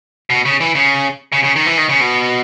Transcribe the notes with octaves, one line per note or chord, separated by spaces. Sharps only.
B2
C#3
E3
C#3
C#3
C#3
D#3
E3
D#3
C#3
B2